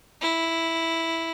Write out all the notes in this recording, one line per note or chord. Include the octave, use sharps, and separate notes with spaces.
E4